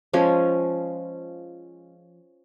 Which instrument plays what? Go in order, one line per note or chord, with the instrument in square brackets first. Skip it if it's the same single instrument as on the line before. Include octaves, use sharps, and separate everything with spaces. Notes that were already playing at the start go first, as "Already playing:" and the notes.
[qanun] F3 G#3 C#4